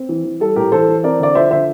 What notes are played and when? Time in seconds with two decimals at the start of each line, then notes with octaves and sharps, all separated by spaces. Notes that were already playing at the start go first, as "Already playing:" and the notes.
Already playing: C4
0.09 E3
0.24 E3
0.40 G3 A4
0.56 A2 G4 A#4
0.72 E3 A4 C5
0.88 E3
1.03 C4 A#4 D5
1.19 D3 D5
1.35 F3 C5 E5
1.51 D3 C5 E5